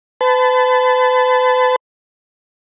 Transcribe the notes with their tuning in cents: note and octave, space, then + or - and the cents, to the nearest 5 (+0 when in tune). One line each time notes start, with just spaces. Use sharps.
B4 +40 A5 -15